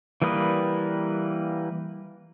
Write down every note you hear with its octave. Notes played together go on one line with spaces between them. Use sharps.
E3 G3 A#3 B4 D#6